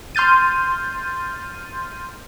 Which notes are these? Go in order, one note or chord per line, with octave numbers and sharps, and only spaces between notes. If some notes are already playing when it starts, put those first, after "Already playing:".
C6 F6 G6 A6 D#7